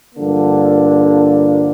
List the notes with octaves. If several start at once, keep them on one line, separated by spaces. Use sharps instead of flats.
G2 D3 F3 A#3